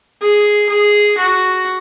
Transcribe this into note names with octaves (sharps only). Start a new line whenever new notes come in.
G#4
G#4
F#4